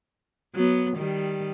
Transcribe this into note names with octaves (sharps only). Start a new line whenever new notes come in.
F#3 B3
D#3 G3